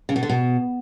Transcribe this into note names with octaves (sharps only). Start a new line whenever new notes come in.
C#3
B2
D3
B2